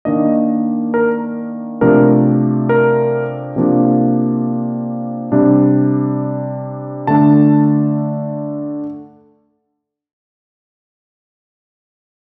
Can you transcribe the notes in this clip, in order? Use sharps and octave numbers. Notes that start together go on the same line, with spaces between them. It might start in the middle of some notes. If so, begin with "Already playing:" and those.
D#3 A#3 D4 D#5
A#4
C3 F3 A3 D4 A#4
A#4
C3 F3 A#3 D4
C3 G3 D4
D3 A3 D4 A5